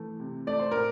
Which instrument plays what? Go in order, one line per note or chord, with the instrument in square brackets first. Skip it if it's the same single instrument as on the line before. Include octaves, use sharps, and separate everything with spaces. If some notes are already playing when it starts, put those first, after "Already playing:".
Already playing: [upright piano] E3 A3
C3
A3 D5
C5
A2 A#4